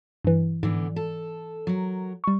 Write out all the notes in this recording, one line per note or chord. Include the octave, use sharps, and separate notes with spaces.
G2 E3
G#2 D3 E3 B3
A4
F#3 A#4
G3 C#6